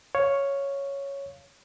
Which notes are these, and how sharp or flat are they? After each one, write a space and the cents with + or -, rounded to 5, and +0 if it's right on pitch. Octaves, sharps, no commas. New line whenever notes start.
C#5 +0 F5 +0